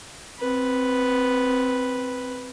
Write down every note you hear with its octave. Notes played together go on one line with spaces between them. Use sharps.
C4 B4